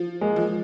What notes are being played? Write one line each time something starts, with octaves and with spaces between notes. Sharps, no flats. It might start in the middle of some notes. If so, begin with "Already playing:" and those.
Already playing: F3
G#3 A#3
F3